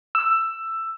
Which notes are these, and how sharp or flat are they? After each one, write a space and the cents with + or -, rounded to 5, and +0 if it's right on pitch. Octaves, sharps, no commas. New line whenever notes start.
E6 +10